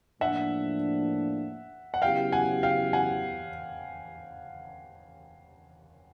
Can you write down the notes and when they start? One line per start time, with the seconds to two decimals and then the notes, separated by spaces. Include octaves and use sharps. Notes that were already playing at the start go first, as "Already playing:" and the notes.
0.20 A2 F3 A#3 D4 E5 F#5
1.94 F#5
2.02 C#3 F#3 B3 E4 G4 F5 G5
2.32 F#5 G#5
2.63 F5 G5
2.93 F#5 G#5